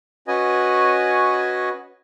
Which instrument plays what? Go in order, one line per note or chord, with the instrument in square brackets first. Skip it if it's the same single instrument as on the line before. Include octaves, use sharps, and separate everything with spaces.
[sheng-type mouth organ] C#4 F#4 B4 D#5 G#5